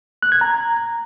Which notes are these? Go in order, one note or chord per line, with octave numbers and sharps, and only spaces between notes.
F#6
G#6
A#5